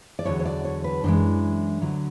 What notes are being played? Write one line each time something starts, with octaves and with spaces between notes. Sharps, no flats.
D5
E2 D3 F#3 C#5
C#5
D5
C#5
B4
F#2 E3 G#3 D4
D2 D3 F#3